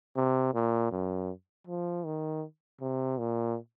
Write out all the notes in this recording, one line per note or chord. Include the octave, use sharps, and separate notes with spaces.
C3
A#2
F#2
F3
D#3
C3
A#2